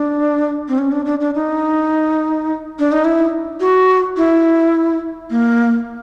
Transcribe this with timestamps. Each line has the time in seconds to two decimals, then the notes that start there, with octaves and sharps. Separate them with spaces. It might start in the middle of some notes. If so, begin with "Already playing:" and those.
Already playing: D4
0.68 C4
0.78 C#4
0.92 D4
1.06 D4
1.21 D4
1.35 D#4
2.79 D4
2.92 D#4
3.05 E4
3.60 F#4
4.17 E4
5.30 A#3